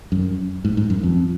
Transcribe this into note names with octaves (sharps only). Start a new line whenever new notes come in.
F#2
G#2
G#2
F#2
F2